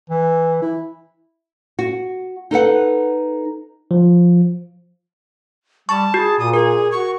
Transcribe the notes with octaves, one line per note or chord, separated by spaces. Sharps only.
E3
E4
F#4
D#4 A4 B4 F#5
F3
G3 A5 C#6
F#4 G#4
A#2 D#6
G#4 A#4
F#4 C#6